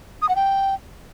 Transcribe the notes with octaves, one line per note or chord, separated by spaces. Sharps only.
D#6
F#5
G5